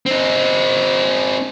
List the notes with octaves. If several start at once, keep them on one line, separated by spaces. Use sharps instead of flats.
C4 D#4